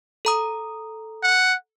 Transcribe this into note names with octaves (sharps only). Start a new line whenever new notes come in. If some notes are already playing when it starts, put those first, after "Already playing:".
A4 A#5 D#6
F#5